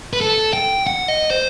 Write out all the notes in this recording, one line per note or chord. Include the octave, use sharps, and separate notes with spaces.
B4
A4
G5
F#5
D#5
C5